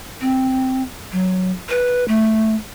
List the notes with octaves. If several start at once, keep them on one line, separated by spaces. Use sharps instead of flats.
C4
F#3
B4
A3